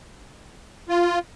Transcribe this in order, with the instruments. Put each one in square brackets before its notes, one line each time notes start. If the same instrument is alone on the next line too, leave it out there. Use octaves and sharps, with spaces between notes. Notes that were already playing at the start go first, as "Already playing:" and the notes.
[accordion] F4